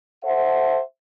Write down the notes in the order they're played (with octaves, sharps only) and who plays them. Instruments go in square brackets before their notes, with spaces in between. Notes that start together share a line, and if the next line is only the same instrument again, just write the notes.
[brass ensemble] A4 C5 E5 F#5